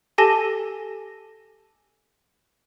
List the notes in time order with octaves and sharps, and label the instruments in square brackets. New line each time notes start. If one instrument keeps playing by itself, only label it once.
[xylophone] G4 A4 G#5 A5 A#6 G7